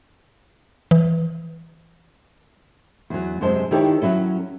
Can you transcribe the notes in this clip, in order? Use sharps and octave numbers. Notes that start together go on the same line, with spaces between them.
E3
E2 F#3
F#2 C3 G#3 C5 A5
D#3 E4 G4 A4 C#5 D5
F#3 C#4 E4 A4